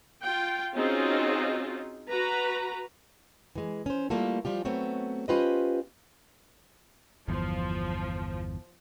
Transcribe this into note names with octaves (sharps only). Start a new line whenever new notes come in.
F4 G5
C4 C#4 D#4 F4 F#4 G#4
F#4 B4 A#5
E3 G#3
C#4 C5
G3 A3 A#3 E4 F4 A4
F3 G3 F4 G4
F#3 A3 B3 C4 C#5
C#4 F4 G4 B4 C5 D#5
G1 E2 F3